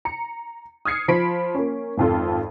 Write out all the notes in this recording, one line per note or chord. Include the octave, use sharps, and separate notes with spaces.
A#5 C#7
D#6 F6 G#6 C7 C#7
F3 B5 B6 D7
A#3 C#4
G#1 F2 F4 A4